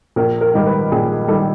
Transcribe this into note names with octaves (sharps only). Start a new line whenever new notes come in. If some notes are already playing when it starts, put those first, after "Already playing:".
A#1 A#4
A#4
G#2 D#3 G3 A#4
B4
A#1 G#4
D#3 G3 A4